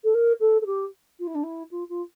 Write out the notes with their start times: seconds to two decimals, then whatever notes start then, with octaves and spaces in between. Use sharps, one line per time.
0.04 A4
0.14 A#4
0.40 A4
0.61 A4
0.66 G4
1.19 F4
1.27 E4
1.35 D4
1.43 E4
1.71 F4
1.89 F4